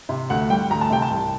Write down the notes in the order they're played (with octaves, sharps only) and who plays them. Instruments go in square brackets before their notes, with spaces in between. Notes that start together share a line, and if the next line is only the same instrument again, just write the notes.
[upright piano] C3
D2 F#5
G3 G5
D2 A#5
A5
C3 G5
A5
C2